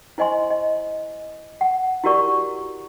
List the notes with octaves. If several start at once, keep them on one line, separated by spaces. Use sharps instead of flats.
E4 C5 D#5 G#5 C6
D#5
F#5
E4 F#4 G4 A#4 D5 C#6